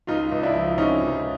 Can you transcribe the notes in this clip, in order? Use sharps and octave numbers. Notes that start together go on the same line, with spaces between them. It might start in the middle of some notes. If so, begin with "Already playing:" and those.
C#2 D#4 F4
C#2
D4 E4
F3
C3 C#4 D#4
C#2